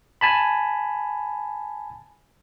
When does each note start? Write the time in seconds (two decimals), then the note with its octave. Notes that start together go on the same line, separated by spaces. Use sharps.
0.21 G#5 A5 B5